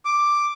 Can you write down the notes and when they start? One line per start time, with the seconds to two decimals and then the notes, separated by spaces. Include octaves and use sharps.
0.05 D6